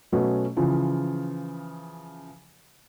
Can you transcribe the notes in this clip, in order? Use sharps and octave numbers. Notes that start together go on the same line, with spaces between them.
B2 F#3 A3 B3 C#4
C#3 E3 F3